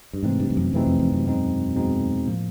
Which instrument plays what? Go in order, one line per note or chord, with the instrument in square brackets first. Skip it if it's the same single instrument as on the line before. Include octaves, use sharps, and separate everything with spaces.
[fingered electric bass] G2
[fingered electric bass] G#2 [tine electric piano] C3 E3 A3 C4 D#4
[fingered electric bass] G2
G2
F#2
[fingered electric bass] F#2 [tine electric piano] C3 E3 A3 C4 D#4
[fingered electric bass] F2
F2
F#2
[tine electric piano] E2 B2 G#3 C4 D#4
E2 B2 G#3 C4 D#4
A2 F3 A#3